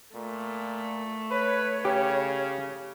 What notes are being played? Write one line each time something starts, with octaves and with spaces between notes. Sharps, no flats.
A#2 A3
B4 C#5
C#3 G4